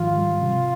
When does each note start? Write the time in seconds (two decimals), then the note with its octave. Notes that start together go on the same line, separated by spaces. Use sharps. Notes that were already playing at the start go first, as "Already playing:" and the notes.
Already playing: G#2 D#3 F3 F4
0.17 G3
0.41 C3